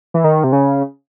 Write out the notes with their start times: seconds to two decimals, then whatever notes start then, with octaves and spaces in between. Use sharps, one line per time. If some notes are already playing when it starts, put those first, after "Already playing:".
0.14 E3
0.24 D#3
0.44 C3
0.53 C#3